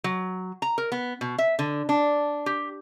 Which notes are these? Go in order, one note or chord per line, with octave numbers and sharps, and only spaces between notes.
F#3
A#5
A#4
B3
B2
E5
D3
D4
G4